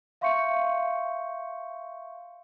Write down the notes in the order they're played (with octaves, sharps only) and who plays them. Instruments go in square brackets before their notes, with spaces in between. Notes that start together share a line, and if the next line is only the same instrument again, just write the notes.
[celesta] E5 F5 C6 C#6 G6 C#7